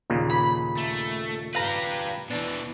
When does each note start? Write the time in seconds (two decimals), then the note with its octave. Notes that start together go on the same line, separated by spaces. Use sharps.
0.10 D#2 A#2 C#3
0.30 B5
0.77 A3
1.55 G4 B4 F5 A#5
2.30 B2 E3 D4